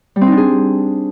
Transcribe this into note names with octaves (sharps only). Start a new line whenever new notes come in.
G3
C4
D#4
D4
G#4